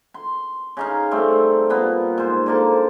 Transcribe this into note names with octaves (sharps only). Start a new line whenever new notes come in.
C6
C#3 D#4 F5
G3 A3 C4
A#2 B3
G#2 C5
D3 A#3 A5